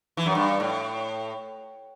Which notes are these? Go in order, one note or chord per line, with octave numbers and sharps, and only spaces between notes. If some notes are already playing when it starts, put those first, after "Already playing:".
E3
F#2
G2
A2